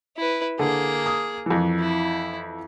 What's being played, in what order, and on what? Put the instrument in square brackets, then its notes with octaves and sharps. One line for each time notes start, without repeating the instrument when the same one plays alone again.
[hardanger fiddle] E4 B4
[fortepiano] D3 [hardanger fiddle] A#3 G#4
[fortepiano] D#6
F2 E3
[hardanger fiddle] E4